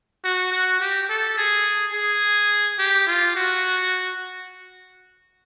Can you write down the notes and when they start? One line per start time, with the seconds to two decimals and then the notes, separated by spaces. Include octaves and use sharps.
0.24 F#4
0.52 F#4
0.80 G4
1.09 A4
1.38 G#4
1.94 G#4
2.79 G4
3.07 F4
3.35 F#4